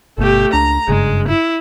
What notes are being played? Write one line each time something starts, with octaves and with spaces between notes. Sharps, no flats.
G1 B2 A3 G4
C#2 D4 A#5
F#1 G2 C#3 G#3
E4